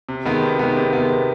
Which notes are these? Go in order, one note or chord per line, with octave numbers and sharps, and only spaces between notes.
C3
D#3 G#3 B3
C3
D#3 G#3 B3
C3
D#3 G#3 B3
C3